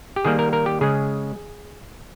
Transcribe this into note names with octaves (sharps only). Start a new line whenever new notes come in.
G4
D#3 G3 A#3 G#4
A#4
A#4
G4
C#3 G#3 G#4